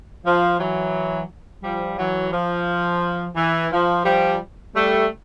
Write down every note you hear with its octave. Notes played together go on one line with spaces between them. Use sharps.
F3
E3 F#3
F3 G3
E3 F#3
F3
E3
F3
F3 G3
G3 A3